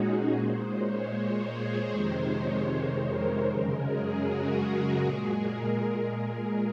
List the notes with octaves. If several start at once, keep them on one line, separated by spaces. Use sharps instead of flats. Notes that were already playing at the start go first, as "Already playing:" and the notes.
Already playing: A#2 G#3 C#4 D#4 F#4 G#4
A#2 G#3 C5
C#5
C#5
G#4
F2 C3 D#3 G#3 C5
C#5
C#5
A#4
F#2 C#3 G#3
G#4
F#4
A#2 G#3 G#4
A#4
G#4